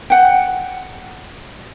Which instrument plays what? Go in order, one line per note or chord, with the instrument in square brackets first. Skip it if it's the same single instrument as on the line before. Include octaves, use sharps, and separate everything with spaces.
[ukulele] F#5 G5